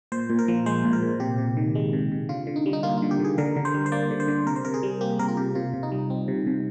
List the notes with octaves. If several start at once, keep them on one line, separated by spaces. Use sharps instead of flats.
A#2 C5
A#2
A#4
F3
G#3 C5
A#2
A#4
A#2
C3 G4
C3
D#3
G#3
C3
C3
D3 F4
D3
D#4
G3
D#4
A#3 F4
F4
D3
G4
D3 G#4
D3 A#4
D3
C5
G3
C5
A#3 D5
D3
C5
D3
C3 A#4
C5
C3 A#4
G#4
G3
A#3 G4
C3 A#4
F4
C3 G4
C3 F4
C3
D#4
G3
C4
C3
C3